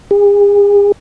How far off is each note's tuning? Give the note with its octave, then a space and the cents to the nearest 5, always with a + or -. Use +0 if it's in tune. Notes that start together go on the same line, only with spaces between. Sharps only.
G#4 -40